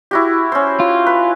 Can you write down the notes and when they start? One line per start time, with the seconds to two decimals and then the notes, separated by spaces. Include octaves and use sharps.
0.11 E4 F#4 G4
0.52 C#4 C5
0.80 F4
1.06 B4